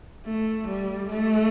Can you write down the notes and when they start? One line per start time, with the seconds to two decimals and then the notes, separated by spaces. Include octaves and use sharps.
0.26 A3
0.68 G3
1.10 A3